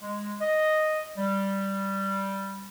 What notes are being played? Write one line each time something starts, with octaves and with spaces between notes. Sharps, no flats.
G#3
D#5
G3